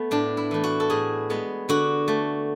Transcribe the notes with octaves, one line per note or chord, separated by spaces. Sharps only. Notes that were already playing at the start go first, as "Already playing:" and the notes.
Already playing: A3 B3
A2 D4
E4
E3 A3
F#4
A4
A2 G#4
G#3 B3
D3 F#4
A3